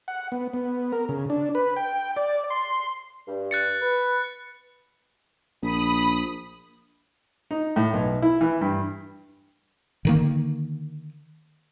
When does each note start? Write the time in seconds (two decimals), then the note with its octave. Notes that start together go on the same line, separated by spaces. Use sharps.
0.08 F#5
0.32 B3
0.53 B3
0.92 A#4
1.09 C#3
1.30 D4
1.55 B4
1.76 G5
2.17 D5
2.50 C6
3.27 G2
3.51 F#6 A6 C#7
3.81 B4
5.62 A#1 B5 D#6
7.51 D#4
7.76 A2
7.93 B1
8.22 E4
8.41 E3
8.61 G2
10.05 D3 D#3 A#3